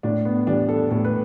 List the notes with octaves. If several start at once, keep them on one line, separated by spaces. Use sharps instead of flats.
A2 D4
B3
E3 G3 D4
A4
A2 A4
B4